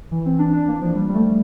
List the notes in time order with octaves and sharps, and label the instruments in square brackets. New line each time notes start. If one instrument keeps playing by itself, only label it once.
[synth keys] E3
C4
D4
D4
A#3
F3
G3
G3
A3